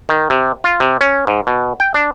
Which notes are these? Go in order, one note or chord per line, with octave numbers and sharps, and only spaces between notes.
D#3
C3
F4
C3
C#4
G#2
B2
G5
D4